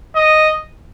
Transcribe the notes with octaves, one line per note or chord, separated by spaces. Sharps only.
D#5